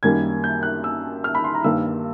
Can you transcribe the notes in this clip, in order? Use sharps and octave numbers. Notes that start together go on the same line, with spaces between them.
F#2 D#3 G3 A#3 G#6
G6
F#6
E6
F6
B5
C6
A#5
G2 D#3 G3 A#3 E6